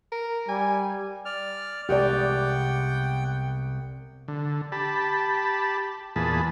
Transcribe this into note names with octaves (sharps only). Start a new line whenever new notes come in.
A#4
G3 G#5
D5 F6
C2 G#3 B3 G4 D5 F#5 G5
D3
G4 A5 B5
E2 A#2 G#4 A5 B5